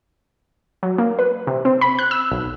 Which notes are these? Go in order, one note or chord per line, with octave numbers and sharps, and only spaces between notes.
F#3
A#3
B4
C3
C4
B5
F#6
E6
B1